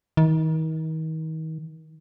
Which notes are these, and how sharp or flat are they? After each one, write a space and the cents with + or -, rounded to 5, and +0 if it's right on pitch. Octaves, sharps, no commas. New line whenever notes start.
D#3 +35